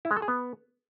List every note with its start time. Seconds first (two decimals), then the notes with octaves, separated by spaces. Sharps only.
0.05 E4
0.11 G#3
0.16 A4
0.22 G#4
0.28 B3